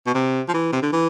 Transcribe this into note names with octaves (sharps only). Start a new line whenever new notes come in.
B2
C3
F3
E3
C3
D3
E3